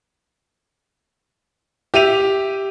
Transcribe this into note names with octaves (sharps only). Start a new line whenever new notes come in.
G4 E5 D#7 F7